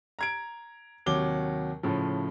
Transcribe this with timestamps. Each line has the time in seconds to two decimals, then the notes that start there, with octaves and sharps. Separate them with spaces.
0.19 A#5 G#6 D7
1.06 D#2 C3 F#3 D6 G7
1.83 A2 C#3 F3